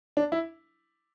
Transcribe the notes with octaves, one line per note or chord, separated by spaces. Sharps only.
D4
E4